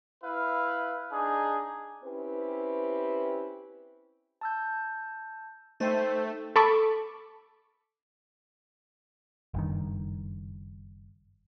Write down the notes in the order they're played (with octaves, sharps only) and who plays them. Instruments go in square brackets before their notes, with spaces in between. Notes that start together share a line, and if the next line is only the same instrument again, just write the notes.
[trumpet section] E4 B4 F5
D4 D#4 G#4
[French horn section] C4 C#4 E4 G4 B4
[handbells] A5 E6 G6
[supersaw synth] A3 [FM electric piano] D#4 [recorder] C5 [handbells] G5 G#6 A6
[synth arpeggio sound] A4 B5 C#6 D6
[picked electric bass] F#1 G2 D#3